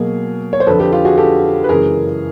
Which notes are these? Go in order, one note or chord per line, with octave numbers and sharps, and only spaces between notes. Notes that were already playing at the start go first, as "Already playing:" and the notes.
Already playing: B2 F#3 A#3 G#4 A#4
C#5
C5
F2 D3 F3 A4 B4
G4 A4
F4 G4
F#4 G#4
G4 A4
B4
F#2 C#3 E3 G#3 G#4 A#4